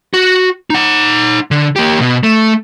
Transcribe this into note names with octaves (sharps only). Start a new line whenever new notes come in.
F#4
D#4 F#5
D3
A#3 G4
E2 B2
A3